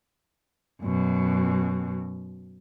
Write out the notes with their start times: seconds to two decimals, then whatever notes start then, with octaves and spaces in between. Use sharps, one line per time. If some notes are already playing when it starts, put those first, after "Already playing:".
0.82 F#2 B2